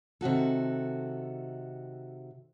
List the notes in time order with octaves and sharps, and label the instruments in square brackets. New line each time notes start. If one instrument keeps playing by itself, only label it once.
[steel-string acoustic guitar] C3 D#3 F#4 A4